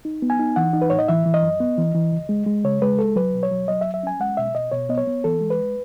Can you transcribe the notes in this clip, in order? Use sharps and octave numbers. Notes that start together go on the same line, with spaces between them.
D#4
B3
G#5
D#4
E3 F#5
D#4
B4
A2 C#5
D#5
E3 E5
E3
D#5
F#2
B3
E3
E3
C#2
G#3
G#3
C#3 C#5
G#3 B4
C#2 A4
F#3 B4
B2
C#5
F#3
F#3 D#5
E5
C#2
E5
C#4 G#5
G#3 F#5
B2 E5
B2 D#5
B2 C#5
B3 D#5
C#5
B3
E3 A4
G#3
B4